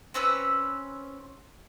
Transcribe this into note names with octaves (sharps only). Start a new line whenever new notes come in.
C4 C#4 B4 E6